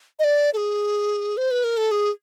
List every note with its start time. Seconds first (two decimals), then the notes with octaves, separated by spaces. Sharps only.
0.19 D#5
0.24 D5
0.54 A4
0.57 G#4
1.37 C5
1.51 B4
1.64 A#4
1.77 A4
1.91 G#4